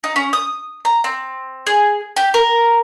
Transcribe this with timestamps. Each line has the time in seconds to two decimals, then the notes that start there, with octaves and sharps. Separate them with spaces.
0.04 D#4
0.16 C#4
0.33 D#6
0.85 A#5
1.04 C4
1.67 G#4
2.16 G4
2.34 A#4